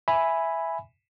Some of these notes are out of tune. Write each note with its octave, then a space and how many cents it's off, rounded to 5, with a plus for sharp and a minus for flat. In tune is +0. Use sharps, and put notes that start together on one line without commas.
E5 +0 G#5 +0 B5 +0